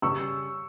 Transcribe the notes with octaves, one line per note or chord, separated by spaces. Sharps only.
C#3 G3 C#4 C#6 E6